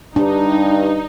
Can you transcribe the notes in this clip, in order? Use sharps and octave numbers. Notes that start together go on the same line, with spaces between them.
G2 D4 D#4